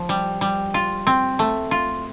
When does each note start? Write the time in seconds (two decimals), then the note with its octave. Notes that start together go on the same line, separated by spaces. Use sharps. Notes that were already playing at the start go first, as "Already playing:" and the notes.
Already playing: F3
0.09 G3
0.41 G3
0.74 F4
1.07 C4
1.39 A3
1.71 F4